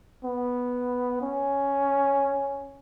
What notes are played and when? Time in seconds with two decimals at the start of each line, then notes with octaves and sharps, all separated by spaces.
0.25 B3
1.21 C#4